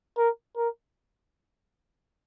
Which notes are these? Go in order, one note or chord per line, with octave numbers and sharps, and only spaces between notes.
A#4
A#4